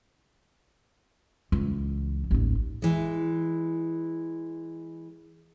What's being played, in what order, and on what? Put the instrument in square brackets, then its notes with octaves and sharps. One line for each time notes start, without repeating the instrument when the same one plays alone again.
[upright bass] C#2 E3
A1 D#2
[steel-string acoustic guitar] E3 G#3